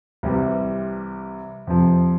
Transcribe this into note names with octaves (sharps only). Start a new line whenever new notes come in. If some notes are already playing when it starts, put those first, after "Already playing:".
C2 C3 E3 G3 C4
F2 C3 F3